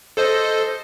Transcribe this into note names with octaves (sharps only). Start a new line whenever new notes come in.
A4 C5 D#5